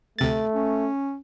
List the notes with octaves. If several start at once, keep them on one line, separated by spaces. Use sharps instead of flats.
D2 C3 A3 A6
C#4